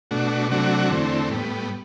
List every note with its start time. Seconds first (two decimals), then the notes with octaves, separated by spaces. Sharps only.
0.11 B2 A3 D4 F#4
0.50 C3 F#3 A3 D4 F#4
0.90 E2 D3 A3 C4
1.29 A2 G3 B3